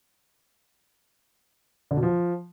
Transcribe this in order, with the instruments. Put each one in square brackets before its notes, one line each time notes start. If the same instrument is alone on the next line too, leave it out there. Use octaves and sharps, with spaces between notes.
[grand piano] D3
B2
F3